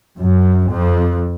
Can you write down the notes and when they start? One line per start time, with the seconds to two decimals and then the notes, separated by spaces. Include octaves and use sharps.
0.18 F#2
0.69 F2